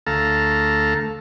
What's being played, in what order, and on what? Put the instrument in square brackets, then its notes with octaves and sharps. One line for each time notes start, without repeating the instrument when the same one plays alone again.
[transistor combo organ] D2 A3 A4 F5 A#5